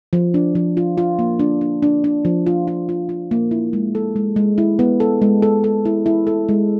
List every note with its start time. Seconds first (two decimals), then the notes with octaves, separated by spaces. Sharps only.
0.13 F3
0.34 D4
0.55 F3
0.77 F4
0.98 F4
1.19 A#3
1.39 D4
1.61 D4
1.82 D4
2.04 D4
2.25 F3
2.46 F4
2.67 F4
2.89 F4
3.09 F4
3.31 A#3
3.51 E4
3.73 G#3
3.95 A4
4.16 G#3
4.36 G#3
4.58 E4
4.79 B3
5.00 A4
5.22 G#3
5.42 A4
5.64 A4
5.85 E4
6.06 E4
6.27 A4
6.49 G#3